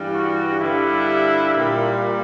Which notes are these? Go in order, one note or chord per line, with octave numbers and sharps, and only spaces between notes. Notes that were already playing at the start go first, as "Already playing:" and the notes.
Already playing: G2 E3 G3
F#4
G2 D3 G3 E4
A#2 G3